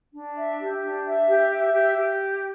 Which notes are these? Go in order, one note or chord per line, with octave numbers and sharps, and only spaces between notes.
D4
E5
G4
D4
E5
G4
E5
G4
G4